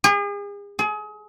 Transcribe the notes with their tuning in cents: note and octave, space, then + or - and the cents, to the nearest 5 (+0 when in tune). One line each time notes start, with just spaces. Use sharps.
G#4 -40
G#4 +30